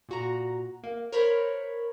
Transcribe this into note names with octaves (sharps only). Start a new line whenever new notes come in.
A#2 F#4 A#5
A#3
A#4 C5 C#5 B5